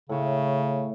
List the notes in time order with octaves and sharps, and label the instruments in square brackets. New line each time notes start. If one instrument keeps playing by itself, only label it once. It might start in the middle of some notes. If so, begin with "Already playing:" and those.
[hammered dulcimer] A2 C#5 [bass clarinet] C#3